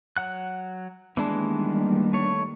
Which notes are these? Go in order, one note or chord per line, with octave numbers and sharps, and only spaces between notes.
F#3 F#5 F#6
D#3 E3 G3 G#3 A#3 B3 D4 A5
A3 C#5